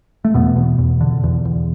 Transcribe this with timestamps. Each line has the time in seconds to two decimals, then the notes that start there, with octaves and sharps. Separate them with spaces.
0.25 A3
0.34 E2 B2 B3
0.56 E2
0.79 E2
1.01 D3
1.23 E2
1.45 E2